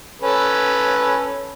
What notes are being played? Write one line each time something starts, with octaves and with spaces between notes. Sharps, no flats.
C#4 A4 B4